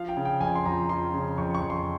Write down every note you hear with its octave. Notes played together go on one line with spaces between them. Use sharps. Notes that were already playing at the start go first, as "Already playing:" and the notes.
Already playing: F3 F5
G5
C#3
G5
F2 G#5
C6
F2 A#5
F3 C6
C#3
F2 C#6
C#6
F2
C6